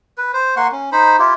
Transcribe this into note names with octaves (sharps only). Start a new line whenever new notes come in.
B4
C5
A#3 F#5 C6 C#6
C#4
D#4 C5 B5
E4 F4 G4